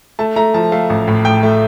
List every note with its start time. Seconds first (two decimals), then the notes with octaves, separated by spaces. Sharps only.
0.19 A3 A5
0.36 A3 A#5
0.54 F3 A5
0.72 A3 F5
0.90 A1
1.08 A2
1.25 A2 G5
1.43 A3